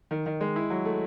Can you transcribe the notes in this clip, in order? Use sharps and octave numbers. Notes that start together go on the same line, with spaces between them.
D#3
D#3
G#3
E4
F#3
A3